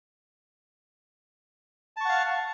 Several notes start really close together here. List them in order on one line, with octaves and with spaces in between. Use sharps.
A5 C#6 F#5 F5